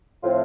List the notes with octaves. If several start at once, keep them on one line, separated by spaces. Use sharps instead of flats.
A2 F3 C4 F4